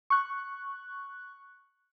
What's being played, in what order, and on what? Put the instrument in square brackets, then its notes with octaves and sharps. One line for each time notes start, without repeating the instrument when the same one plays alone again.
[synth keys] C#6 F#6